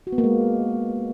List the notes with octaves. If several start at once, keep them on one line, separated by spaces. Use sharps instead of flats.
F#4
B3
A#3
G#3